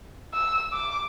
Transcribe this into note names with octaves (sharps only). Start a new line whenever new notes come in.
E6
D6